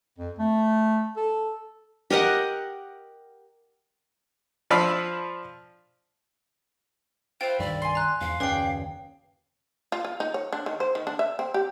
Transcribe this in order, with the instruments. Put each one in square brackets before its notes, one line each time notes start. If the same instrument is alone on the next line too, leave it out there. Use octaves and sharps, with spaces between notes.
[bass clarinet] F2
A3
A4
[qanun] G4 A#4 D#5 F#5
[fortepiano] F3 D4 F5 B5 E6
[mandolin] F4 B4 E5 [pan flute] C5 [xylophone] G5
[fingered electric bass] C2 G2 D#3 [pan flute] D5
[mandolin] G#5 C6
[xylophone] A#5 F#6
[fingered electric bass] E2 G#2 [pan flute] F5
[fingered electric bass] F#1 D#2 C#4 [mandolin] G#4 D5 G5 [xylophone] B4 C7
[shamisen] F4
F4
D#4
C#5
D4
D#3
C5
D#3
D4
E5
C4
G4